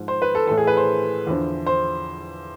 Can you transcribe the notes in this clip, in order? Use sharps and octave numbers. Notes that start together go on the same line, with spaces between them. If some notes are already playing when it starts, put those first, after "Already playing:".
Already playing: G#2 F3
C5
B4
A4
A2 E3 A4
G#4
B4
C5
E2 D3 F3
C5